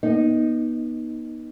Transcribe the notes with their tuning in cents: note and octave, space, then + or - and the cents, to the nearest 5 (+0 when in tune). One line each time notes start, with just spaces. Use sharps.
B3 -30 D#4 +0 D#5 +0